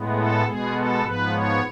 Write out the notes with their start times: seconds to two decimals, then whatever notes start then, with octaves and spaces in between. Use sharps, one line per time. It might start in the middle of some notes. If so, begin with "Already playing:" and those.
Already playing: A2 G#3 B3
0.14 A4
0.43 B2 G#3 B3 G#4
0.73 A4
1.02 G#2 F3 B3 B4
1.32 C#5